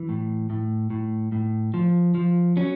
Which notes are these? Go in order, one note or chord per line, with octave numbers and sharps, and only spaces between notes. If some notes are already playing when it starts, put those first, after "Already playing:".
Already playing: E3
A2
A2
A2
A2
F3
F3
F#3 C#4